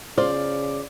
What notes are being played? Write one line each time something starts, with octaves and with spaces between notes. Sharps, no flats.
C#3 F4 C5 D5